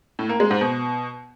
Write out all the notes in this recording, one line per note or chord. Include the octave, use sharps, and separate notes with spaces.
A2
A#3
G#3
G#2
B2